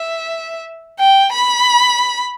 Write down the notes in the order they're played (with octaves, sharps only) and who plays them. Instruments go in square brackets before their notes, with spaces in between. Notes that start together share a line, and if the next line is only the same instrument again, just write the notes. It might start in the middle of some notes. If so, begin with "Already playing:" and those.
Already playing: [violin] E5
G5
B5